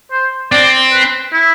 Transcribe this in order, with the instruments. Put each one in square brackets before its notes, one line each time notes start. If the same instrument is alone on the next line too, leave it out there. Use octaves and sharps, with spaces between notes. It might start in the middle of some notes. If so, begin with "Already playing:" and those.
[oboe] C5
[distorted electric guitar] C4 [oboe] D5
[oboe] B4
E4